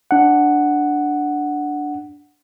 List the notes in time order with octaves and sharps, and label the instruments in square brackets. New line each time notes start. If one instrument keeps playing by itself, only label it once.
[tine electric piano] D4 F#5